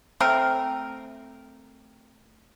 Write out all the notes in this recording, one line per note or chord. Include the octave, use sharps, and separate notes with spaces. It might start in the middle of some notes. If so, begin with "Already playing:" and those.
A3 C4 A#4